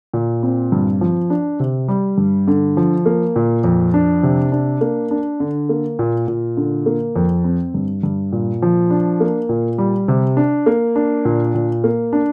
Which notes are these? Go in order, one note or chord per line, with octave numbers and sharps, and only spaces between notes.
A#2
C4
G2
F3
D4
C3
G3
G2
D3
F3
A#3
A#2
F2
D4
C3
D4
A#3
D4
D3
A#3
A#2
A#2
D3
A#3
F2
C4
G2
G2
A#2
F3
D4
A#3
A#2
G3
C3
D4
A#3
D4
A#2
A#2
A#3
D4